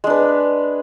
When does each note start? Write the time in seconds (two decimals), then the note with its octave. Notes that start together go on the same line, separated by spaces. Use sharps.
0.04 G#3
0.07 D4
0.10 B4